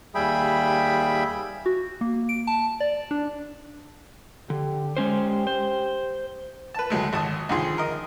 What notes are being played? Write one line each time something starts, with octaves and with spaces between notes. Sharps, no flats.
D#2 G3 G#4 E5 G5 B5
F#4
A#3
D7
A5
D5
D4
D3 G4
G#3 C#4 C5
C5
B4 A5
D2 F#3 G#3 A3
G#1 A5 D#6
C2 D3 D#3 F3 G#4 C6
A#4 D#5